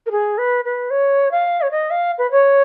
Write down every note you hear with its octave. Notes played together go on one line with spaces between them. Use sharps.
A#4
G#4
B4
B4
C#5
F5
C#5
D#5
F5
B4
C#5